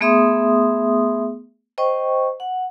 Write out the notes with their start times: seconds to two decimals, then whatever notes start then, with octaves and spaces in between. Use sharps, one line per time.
0.01 A3 B3 G#4 E5 C6 D#6
1.78 C5 D#5 G5 C#6
2.40 F#5